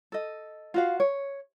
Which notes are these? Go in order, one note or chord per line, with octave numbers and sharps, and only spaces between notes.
A4 D#5
F4 F#4 F5
C#5